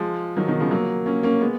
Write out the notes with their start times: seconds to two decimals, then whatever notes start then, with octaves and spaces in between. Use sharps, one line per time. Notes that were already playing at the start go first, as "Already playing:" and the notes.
Already playing: F3 G#3
0.37 D#3 F#3
0.48 B2 D#3
0.60 C#3 F3
0.71 F#3 A#3
1.06 A#3 C#4
1.23 A#3 C#4
1.41 G#3 B3